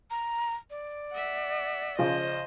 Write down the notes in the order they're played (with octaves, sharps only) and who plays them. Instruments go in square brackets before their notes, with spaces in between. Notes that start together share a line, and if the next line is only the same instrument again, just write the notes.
[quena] A#5
D5
[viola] E5 F#5
[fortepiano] C#3 F3 [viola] C5 D#5